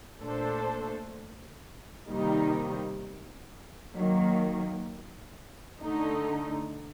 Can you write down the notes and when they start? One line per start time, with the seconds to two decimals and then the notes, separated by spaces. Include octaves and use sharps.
0.21 A#2 A3 D4 A4 C5
2.08 C3 D#3 G3 A#3 D#4
3.96 D#3 F#3 A#3
5.82 D3 A3 D#4